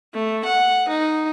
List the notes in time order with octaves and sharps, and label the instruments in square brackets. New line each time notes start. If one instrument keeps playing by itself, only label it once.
[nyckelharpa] A3
F#5
D#4